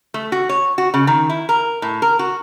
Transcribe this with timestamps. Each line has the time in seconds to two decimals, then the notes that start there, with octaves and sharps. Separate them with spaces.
0.14 A3
0.32 F#4
0.49 C#5
0.78 F#4
0.94 C#3
1.07 D#3
1.29 E4
1.49 A#4
1.82 A2
2.02 A#4
2.19 F#4